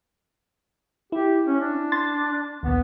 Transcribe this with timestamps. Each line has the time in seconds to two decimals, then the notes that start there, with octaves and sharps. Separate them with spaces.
1.12 E4 G4
1.47 C#4
1.61 D4
1.92 C6 A6
2.63 A#1 D#2 B3